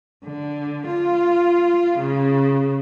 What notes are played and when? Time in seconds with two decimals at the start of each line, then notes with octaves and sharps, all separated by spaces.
0.25 D3
0.88 F4
1.99 C#3